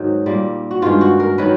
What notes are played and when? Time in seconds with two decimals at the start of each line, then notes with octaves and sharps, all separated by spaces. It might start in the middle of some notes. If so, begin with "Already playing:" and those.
Already playing: G#2 D#3 F#3 D#4
0.26 A#2 G3 A#3
0.71 F#4
0.82 G2 D#3 G#3 F4
1.01 F#4
1.20 A#4
1.38 D#3 F#3 B4